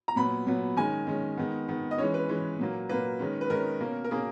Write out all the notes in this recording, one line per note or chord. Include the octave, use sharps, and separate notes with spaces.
A#5
A#2 F#3 B3 B5
A#2 F#3 B3
D#3 G#3 C#4 G#5
D#3 G#3 C#4
D#3 G#3 B3
D#3 G#3 B3
D#5
E3 G#3 C#4 C#5
B4
E3 G#3 C#4
A#2 F#3 A#3
A#2 F#3 A#3 B4
D#3 G#3 C#4
B4
D#3 G#3 C#4 A#4
B2 A#3 C#4
A#4
B2 A#3 C#4 G#4